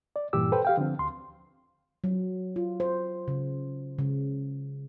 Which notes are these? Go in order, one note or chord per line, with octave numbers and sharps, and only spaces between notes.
D5
G2 A#2 E3 G4 D6 E6
A4 B4 C5 G5
G4 F5 G5
D3 F3 C4
D2 C6
F#3
F4
C5
C#3
C#3